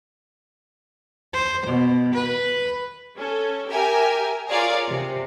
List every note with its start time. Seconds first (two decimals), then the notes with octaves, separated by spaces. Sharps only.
1.34 C5
1.66 B2
2.14 B4
3.17 C#4 A4
3.68 G4 A#4 E5 G5 G#5
4.50 F4 G#4 A#4 C#5 D5 F5
4.90 C3